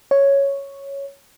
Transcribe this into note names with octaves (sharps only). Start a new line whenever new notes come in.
C#5